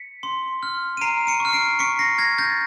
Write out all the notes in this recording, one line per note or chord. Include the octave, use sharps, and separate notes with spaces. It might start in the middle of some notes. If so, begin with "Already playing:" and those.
Already playing: B6 C#7
C6
F6
D#7
A#5 C7 D7
C#7 D#7
C#6 F6
C7 D7
C#6 B6 C#7
A#6 C7
F6 G#6 A#6
G6 A6